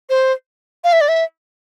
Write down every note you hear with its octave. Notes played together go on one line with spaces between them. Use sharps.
C5
F5
E5
D5
E5